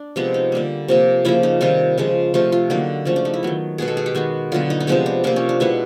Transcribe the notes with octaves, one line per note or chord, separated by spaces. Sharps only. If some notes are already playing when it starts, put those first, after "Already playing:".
Already playing: D4
C3 F3 G#3 B3
D#4
D3 G3 A#3
C3 F3 A#3
C#3 F3 A#3 E4
D#4
C3 D#3 G3 F4
C#3 F3 G#3
C3 F3 A3 F4
F4
D3 F#3 A#3 D#4
C#3 F3 A3 C#4
D4
D#4
E4
D#3 F#3 B3
B2 G#3 B3 G#4
A4
G#4
G4
D#3 G#3 B3 F#4
D3 F#3 B3 F4
D#4
D#4
C3 F3 G#3 B3 D4
D4
C3 F3 A#3 D4
C#4
D4
B2 G#3 B3 E4